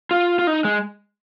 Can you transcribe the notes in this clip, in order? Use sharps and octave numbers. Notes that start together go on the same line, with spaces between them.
F4
F4
D#4
G#3